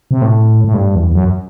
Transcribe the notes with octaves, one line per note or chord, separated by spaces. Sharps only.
C3
A2
A2
G2
E2
E2
F#2